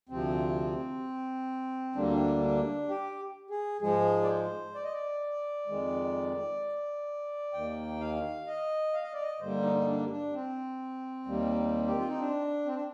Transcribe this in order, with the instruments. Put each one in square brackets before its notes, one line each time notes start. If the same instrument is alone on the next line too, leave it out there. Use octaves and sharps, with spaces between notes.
[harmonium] D2 C3 F3 C4
D2 D3 G3 A#3 D4
C4
D4
D4
G4
G#4
G#2 F3 G#3 G#4
D5
C5
D5
D#5
D5
F2 D#3 G#3
D#2 D#3 A#3 G5
F5
D#5
F5
D#5
D5
D#5
G2 D3 G3 A#3 C5
D#4
D#4
D4
D4
C4
D#2 D#3 G3 A#3
G4
F4
D#4
D4
C4
D4